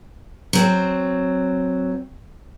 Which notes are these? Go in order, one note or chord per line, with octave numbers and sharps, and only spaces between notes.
F#3 C4